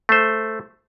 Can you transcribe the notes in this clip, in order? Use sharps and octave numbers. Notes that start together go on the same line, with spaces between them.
A3 C5